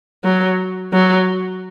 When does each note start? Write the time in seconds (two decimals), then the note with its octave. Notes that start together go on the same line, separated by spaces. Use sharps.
0.24 F#3
0.93 F#3